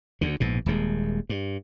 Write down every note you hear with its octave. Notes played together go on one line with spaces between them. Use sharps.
D2 D3
A#1 G#2 B2
D#1 D#2 G#3
G2